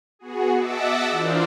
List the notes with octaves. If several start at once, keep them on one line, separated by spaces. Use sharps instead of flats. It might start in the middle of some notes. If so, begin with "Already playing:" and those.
B3 F#4 G#4
D#5 E5 F#5 A5 D6 E6
E3 D4 F4 A#4 C5 D5